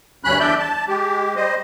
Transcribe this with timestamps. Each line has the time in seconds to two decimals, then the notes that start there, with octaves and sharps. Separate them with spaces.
0.24 D2 G2 C#4 B5 F#6
0.39 E2 D4 D5 E5 G6
0.59 A5
0.88 G#3 G4
1.36 G3 C5 D#5